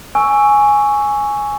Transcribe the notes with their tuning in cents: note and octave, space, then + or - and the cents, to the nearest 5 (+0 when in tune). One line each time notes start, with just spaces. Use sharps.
G#5 +0 C#6 +10 E6 +0